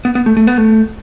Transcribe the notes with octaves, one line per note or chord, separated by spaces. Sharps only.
B3
B3
A3
A3
B3
A3